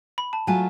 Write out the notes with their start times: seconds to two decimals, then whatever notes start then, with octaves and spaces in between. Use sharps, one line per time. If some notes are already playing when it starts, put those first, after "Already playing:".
0.18 B5
0.33 A5
0.47 F#3 A3 F4 G#5